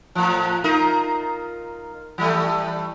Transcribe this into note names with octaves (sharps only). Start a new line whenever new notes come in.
A2 F3
D#4 F4 A#4
E3 G3 A3